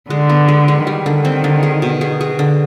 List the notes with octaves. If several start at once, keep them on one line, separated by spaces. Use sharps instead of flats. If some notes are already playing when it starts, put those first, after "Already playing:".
D3 G#3
B3
G#3
G#3
D#3 G3
D3
C4
D3
G#4
B2
G#4
G#4
D3